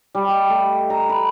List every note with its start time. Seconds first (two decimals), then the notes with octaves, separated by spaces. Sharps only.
0.15 G3
0.28 D#5
0.49 A3
0.90 A#5
1.09 B4